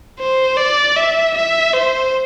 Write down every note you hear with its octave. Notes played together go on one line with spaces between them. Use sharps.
C5
D5
E5
E5
C5